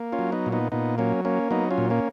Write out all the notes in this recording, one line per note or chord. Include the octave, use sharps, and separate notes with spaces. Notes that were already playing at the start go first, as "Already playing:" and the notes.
Already playing: A#3
C#4 F4
F#3
B3 D#4
A#2
B3 D#4
A#2 B3 D#4
F#3 A#3 C#4
A#3 C#4
F#3 B3 D#4
C#4 F4
A#2
A#3 C#4